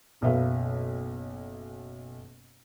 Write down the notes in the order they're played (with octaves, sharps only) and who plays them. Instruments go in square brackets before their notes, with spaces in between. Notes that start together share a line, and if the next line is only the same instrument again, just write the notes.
[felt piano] F#1 B1 B2 B4 E5 F5